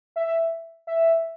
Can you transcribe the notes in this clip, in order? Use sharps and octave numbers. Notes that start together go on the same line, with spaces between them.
E5
E5
E5